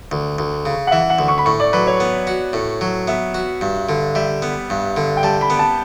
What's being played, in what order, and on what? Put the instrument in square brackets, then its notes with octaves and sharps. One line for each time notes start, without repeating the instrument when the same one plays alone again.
[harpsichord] D2
D2
C#3
[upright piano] F#5
[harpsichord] E3 [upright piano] E5
[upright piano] F#5
[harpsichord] D2
[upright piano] C#6
B5
[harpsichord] A2 [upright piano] C#6
[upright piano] D5
[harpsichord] F#3 [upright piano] B4
[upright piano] C#5
[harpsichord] B3
F#4
A2
F#3
[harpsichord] B3 [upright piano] E5
[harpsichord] F#4
G2
D3
[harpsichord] G3 [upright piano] E5
[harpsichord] B3
G2
D3
[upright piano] G5
[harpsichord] G3 [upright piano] A5
[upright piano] B5
[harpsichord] B3
[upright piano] A5